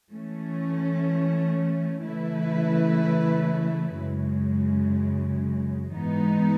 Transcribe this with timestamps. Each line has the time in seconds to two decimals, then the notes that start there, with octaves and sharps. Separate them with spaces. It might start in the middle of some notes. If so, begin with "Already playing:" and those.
0.12 E3 A3 C#4
2.04 C#3 E3 A3 E4 B4
3.98 F#2 C#3 G#3
5.91 G#2 E3 B3 D#4